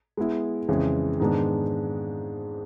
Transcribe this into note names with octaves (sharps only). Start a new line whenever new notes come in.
G#3 B3 E4
F2 C#3 E3 G#3
G#2 D#3 G#3 B3 D4